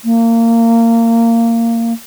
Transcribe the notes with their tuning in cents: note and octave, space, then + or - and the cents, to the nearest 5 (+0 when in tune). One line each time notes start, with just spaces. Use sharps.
A#3 -20